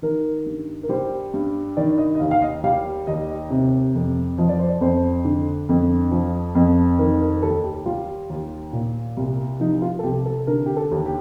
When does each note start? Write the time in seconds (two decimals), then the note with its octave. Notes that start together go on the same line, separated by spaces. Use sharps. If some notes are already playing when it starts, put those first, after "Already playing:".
0.02 D#3 A#4
0.46 G2
0.83 A#4
0.89 G3 C5
1.34 G2
1.77 D#3 D5
1.98 D#5
2.15 D#5
2.20 D#2 F5
2.31 F5
2.42 D#5
2.64 G3 F5
3.07 D#2 D#5
3.50 C3
3.95 F2
4.38 F3 D#5
4.49 D5
4.59 C5
4.69 D5
4.81 F2 C5
5.25 D3
5.69 F2
6.11 F3
6.55 F2
6.98 D#3 A#4
7.21 A#4
7.42 D#2 A4
7.64 G4
7.86 G3 F4
8.30 D#2
8.73 A#2
9.17 C2
9.60 F3 D#4
9.82 F4
9.99 A4
10.03 C2 G4
10.26 A4
10.47 D3 A#4
10.66 G4
10.76 A4
10.91 D#2
11.06 G4